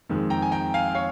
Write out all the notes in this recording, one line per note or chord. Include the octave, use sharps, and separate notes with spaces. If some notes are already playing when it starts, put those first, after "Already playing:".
F2 D#3 G#3
G5 A#5
G#5
G5 A#5
F5 G#5
C#5 F5